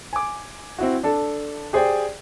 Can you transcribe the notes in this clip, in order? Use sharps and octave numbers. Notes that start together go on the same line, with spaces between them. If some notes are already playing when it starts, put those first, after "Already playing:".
G#5 D6
C4 E4 F#4
D4 A4
G4 G#4 C5 D5 G5